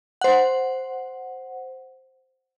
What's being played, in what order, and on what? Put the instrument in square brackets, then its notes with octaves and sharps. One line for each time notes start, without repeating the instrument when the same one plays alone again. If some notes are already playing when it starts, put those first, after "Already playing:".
[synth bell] C5 F#5